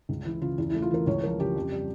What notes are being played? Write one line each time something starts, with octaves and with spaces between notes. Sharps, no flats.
C#2
E3 E4
C#3 F4
E2 E4
E4
A3
F4
E3 A#4
C#2 C#5
F3 A#4
C#3 G4
F2
G3